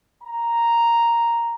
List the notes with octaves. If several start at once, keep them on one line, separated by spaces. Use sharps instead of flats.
A#5